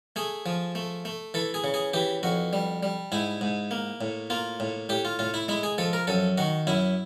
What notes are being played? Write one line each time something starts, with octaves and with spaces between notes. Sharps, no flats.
A3 G#4
F3
A3
A3
E3 A4
G#4
C#3
G#4
E3 G4
F2 F#4
G3
G3
G#2 E4
G#2
A#3
A2
A#3 F4
A2
A2 G4
F4
A2 F4
E4
G#3 E4
G#4
F3 A4
A#4
F#2 A4
D#3 F#4
F#2 E4